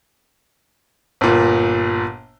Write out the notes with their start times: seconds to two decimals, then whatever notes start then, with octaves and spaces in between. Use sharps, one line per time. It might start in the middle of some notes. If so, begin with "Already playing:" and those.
1.21 G1 A#2